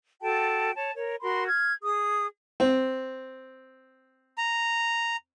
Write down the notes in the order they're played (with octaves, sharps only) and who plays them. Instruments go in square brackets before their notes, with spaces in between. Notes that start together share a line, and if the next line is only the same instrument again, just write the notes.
[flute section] F#4 A4 G5 A5
C#5 A5
A#4 C#5
F#4 A#4 B5 C6
F6 G#6
G#4 D#6
[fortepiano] C4
[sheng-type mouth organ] A#5